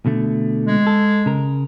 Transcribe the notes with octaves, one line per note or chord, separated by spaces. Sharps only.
B2 D3 A3
G#3
A4
C#3 A#4